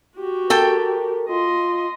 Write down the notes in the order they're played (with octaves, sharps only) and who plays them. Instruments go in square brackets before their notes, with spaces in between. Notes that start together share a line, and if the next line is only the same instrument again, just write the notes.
[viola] F#4 G4
[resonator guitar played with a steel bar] A4 G5 [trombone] A#4
[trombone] F4 [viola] D#5 C6